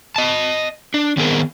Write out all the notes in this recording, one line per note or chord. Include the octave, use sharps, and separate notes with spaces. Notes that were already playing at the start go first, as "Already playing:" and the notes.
D#5 A5
D4
D#3 B3 C4 G#4 A#4